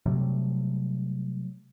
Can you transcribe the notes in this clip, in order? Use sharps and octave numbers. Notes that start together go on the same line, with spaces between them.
C3 F#3 G3 A3